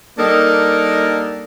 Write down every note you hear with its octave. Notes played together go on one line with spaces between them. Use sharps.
G3 A#3 D4 D#4 A4 A#4